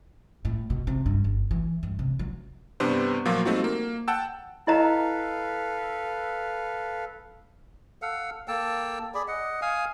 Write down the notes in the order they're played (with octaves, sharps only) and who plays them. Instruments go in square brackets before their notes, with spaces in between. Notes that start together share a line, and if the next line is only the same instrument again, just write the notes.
[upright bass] A2
B2
C3
G2
G1
E3
G2
C3
F#3
[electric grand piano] G2 C3 B3 D4 C5
A#2 F3 F#3 A#3 F4 F#4
G3 A3 C4 D#4 F4 F#4
A#3
F#5 G5 A5 E6
[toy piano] E4 D#5 A#5 [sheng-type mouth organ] A4 B4 F5
[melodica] A4 F5 F#5
A#3 A4 G5 A5
G#4 D5 B5
D#5 F#5
F5 G#5 D#6